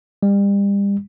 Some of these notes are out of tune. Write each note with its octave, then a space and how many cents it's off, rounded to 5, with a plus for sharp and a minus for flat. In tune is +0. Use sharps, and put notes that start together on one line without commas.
G3 +35